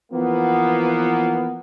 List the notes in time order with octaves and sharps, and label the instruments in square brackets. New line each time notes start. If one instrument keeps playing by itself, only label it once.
[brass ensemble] E3 F3 A#3 B3